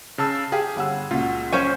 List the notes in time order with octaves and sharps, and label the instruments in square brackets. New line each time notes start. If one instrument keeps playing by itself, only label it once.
[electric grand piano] C#3 A5 E6
[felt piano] G4 F5 G5 [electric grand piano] G#4
[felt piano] G1 F#5 E6
[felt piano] C#2 A#2 F#4 [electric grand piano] F4
[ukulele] C#4 C5 G#5 [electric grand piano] C#6